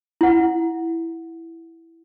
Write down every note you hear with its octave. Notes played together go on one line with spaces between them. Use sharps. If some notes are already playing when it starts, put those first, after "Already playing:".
E4 F#5